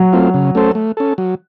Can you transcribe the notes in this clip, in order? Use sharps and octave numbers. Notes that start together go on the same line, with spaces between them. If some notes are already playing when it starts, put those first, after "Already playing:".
Already playing: F#3
A3 C4 F4
C#3
A3 C#4 A4 C5
A3
C#4 A4
F#3